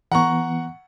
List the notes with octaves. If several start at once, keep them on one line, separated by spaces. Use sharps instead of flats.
E3 B3 F#5 A#5 C#6